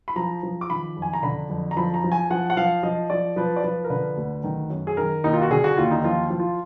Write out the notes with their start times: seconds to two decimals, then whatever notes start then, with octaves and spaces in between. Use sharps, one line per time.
0.08 B5
0.16 F3 A#5
0.43 F3
0.61 D6
0.70 D#3 B5
0.97 F2
1.02 G#5
1.13 A#5
1.23 D3 B5
1.50 F2
1.71 A#5
1.77 F3 B5
1.94 A#5
2.04 F3
2.12 G#5
2.30 F3 F#5
2.50 F#5
2.57 F3 F5
2.83 F3 D#5
3.10 F3 D5
3.36 F3 B4
3.56 D5
3.64 F3 B4
3.84 A#4
3.90 D3 B4
4.17 D2
4.44 D#3
4.70 F#2
4.87 G#4
4.97 D#3 A#4
5.24 D#2 D#4
5.33 F4
5.42 F#4
5.51 D3 G#4
5.64 F#4
5.77 D#2 F4
5.91 D#4
6.04 F3 F4
6.30 F3
6.40 F4